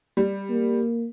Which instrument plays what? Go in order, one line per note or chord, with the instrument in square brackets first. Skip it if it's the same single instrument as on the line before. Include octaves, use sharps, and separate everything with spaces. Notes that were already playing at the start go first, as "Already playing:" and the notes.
[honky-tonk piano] G3
[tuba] A#3